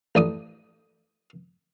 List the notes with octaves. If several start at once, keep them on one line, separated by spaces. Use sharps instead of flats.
A1 D5 D#6